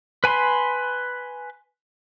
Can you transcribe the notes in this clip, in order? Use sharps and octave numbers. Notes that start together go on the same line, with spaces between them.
B4 G#5 B5 C6